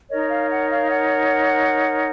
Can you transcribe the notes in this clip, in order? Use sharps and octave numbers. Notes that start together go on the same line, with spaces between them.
D#4 A#4 C#5 D#5
F5
F#5
F5
F#5